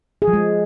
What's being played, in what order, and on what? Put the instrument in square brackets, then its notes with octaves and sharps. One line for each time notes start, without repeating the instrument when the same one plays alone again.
[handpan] G#4
F3
G#3